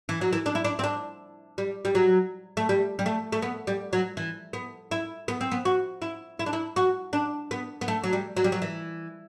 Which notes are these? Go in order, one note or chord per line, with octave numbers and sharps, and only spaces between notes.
E3
F#3
E3
D4
E4
D4
C4
D4
G3
G3
F#3
A3
G3
G3
A3
A3
B3
G3
F#3
E3
B3
E4
B3
C4
B3
F#4
E4
E4
D4
E4
F#4
D4
B3
B3
A3
F#3
G3
F#3
G3
F#3
E3